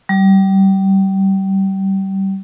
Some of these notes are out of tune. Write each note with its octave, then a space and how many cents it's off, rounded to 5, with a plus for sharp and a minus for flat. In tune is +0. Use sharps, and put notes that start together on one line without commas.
G3 -25